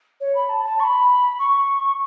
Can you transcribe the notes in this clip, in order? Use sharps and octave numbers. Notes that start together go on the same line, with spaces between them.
C#5
B5
A5
A5
C#6
B5
C#6